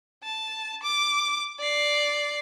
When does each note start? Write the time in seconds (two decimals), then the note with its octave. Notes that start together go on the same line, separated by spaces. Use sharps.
0.23 A5
0.83 D6
1.59 D5 C7